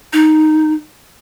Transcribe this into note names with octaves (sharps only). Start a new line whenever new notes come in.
D#4